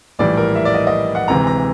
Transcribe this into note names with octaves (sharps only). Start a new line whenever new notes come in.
A#1 A2 E3 G3 D5
A#4
E5
D5
D#5
D#5
F#5
D2 C3 E3 G#3 A#5
A#5